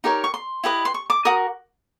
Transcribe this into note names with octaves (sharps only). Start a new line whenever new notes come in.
D#4 G4 A#4 C#5
C#6
C6
E4 G4 B4 D#5
C6
C#6
D6
F#4 A#4 D#6